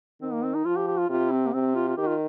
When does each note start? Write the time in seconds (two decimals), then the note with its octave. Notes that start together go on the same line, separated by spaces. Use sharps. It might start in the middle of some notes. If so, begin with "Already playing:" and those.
0.22 D#3 C4
0.33 A#3
0.44 C4
0.55 D#4
0.66 F3 F4
0.77 G4
0.88 G4
0.98 F4
1.09 C3 F4
1.32 C4
1.47 A#3
1.54 C3 C4
1.75 F4
1.88 F4
1.97 D#3 G4
2.08 F4